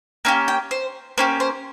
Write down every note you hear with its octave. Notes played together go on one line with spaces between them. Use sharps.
A#3 C#4 G4 F5
G5
C5
A#3 C#4 G4 C5
C5